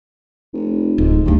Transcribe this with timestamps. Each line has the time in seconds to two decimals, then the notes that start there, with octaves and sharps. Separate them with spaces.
0.54 F1
0.98 D1 G#2
1.26 G#1 D2 G2